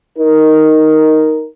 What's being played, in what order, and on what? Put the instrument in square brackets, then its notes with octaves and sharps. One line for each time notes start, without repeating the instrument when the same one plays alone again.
[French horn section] D#4 A#4